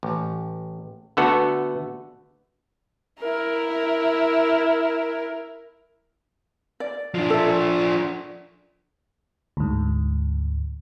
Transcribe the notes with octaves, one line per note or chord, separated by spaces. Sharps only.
A1
D3 A3 B3 F#4 A4
E4 A#4
D5
F3 D4
A4 E5
D2 G#2